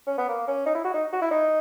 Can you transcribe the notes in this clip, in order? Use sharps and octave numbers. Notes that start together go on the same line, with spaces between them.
C#4
B3
A#3
C#4
D#4
E4
F#4
D#4
F#4
E4
D#4